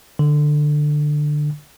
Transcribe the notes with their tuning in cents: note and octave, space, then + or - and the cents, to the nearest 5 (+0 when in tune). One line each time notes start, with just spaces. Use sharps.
D3 +15